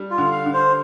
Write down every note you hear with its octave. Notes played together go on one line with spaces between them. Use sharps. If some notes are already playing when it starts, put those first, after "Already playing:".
Already playing: G3 D4
F4
D3
F5
D3
C5